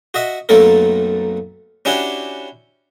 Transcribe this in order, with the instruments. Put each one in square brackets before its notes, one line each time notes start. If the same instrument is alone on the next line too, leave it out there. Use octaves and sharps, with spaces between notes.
[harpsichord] F#4 D#5 E5
B1 F#2 A3 A#3 A4 A#4
C#4 D4 E4 F#4 G4